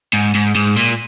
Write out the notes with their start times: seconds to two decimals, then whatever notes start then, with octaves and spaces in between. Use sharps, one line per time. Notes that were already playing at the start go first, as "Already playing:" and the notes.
0.13 G#2
0.35 G#2
0.55 G#2
0.76 A#2